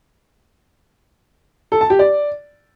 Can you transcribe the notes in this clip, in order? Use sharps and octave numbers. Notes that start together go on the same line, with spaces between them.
A4
A5
G4
D5